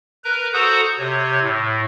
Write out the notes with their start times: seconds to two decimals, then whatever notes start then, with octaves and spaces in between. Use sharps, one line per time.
0.24 A#4 B4 A#5
0.54 F#4 A4 C5 F#5 A#5 D#6
0.98 C3 C#5
1.42 A2